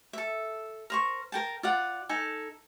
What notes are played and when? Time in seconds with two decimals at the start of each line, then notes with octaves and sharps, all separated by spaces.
0.13 A4 E5
0.90 A#4 C5 C#6
1.32 A#4 G5 A5
1.63 F4 D5 F#5
2.09 D#4 A4 G#5